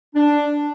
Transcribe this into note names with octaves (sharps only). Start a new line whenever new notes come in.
D4